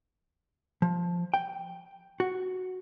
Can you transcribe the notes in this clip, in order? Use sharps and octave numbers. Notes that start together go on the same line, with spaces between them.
F3
G5
F#4